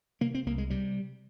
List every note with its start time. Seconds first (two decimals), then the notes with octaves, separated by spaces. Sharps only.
0.21 C3 A#3
0.34 C4
0.46 C2 A#3
0.58 G#3
0.70 C3 G3